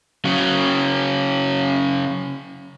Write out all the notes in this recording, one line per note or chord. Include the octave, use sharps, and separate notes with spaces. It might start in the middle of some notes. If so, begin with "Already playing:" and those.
C#3 F#3